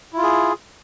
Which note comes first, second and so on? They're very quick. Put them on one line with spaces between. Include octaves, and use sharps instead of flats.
E4 F4 G#4